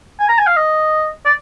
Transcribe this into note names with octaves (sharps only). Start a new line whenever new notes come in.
G#5
A#5
G#5
F5
D#5
D5